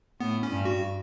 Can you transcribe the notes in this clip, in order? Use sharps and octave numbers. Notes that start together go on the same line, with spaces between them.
A2 B3
C#4
G2
F#4